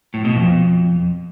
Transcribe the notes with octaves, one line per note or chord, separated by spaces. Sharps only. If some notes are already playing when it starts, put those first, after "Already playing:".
A2
B2
F2